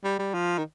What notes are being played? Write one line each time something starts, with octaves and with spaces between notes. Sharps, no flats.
G3
G3
F3
D#3